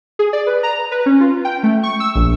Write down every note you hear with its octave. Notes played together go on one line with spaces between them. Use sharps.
G#4
D5
B4
A#5
B4
C#4
F4
G5
A3
C#6
E6
A#1